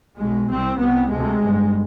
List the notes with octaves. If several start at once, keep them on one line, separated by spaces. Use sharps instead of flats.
B1 B2 G#3
C2 C3 C4
C2 C3 B3
D2 C3 G#3
G1 G2